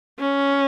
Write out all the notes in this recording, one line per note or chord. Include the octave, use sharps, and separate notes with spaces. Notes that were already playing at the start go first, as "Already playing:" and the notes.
C#4